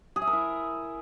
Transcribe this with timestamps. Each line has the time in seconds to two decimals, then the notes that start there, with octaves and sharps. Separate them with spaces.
0.16 G#4
0.22 E5
0.27 A#4
0.33 E4